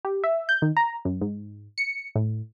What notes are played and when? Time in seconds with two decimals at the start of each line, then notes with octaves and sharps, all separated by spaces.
0.05 G4
0.24 E5
0.49 G6
0.62 D#3
0.77 A#5
1.05 F#2
1.21 G#2
1.78 C#7
2.16 A2